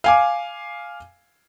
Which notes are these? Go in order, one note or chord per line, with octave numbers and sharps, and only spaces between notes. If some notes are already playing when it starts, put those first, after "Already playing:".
F5 G#5 D6